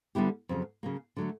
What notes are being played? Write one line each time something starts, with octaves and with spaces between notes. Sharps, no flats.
D3 G3 B3 E4 G4
F2 C#3 F#3
C#3 F#3 A#3
D3 F#3 A3